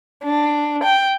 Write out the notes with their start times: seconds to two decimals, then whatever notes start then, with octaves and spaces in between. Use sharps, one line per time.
0.24 D4
0.84 G5